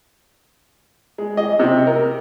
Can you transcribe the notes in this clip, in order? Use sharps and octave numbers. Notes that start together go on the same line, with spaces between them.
G#3
D#5
C3
A#4